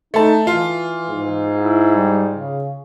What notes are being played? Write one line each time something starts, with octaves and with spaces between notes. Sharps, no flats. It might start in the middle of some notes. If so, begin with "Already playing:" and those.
A3 D#4 A5
E3 F4
G#2
E4
G3
C#3